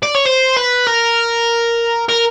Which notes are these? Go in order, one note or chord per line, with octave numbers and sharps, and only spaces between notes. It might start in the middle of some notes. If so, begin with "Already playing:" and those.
D5
C#5
C5
B4
A#4
A#4